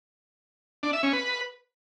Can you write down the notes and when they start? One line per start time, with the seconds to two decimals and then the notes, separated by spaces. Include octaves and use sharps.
0.83 D4
0.93 E5
1.03 C#4
1.13 B4